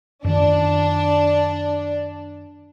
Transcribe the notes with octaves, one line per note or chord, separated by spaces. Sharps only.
F#2 D#3 D4